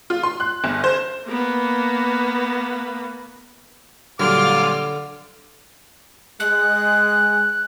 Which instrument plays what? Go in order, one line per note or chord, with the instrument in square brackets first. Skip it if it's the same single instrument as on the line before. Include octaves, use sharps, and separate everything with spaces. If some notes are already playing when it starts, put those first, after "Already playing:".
[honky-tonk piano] F4
C6
F#6
G1
C5
[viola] A#3 B3
[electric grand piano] A#2 F#3 G3 [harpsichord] D3 [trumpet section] F4 D6 [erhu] F6
[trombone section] G#3 [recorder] F#6